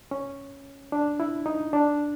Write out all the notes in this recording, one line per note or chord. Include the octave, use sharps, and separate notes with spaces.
C#4
D4
E4
D#4
D4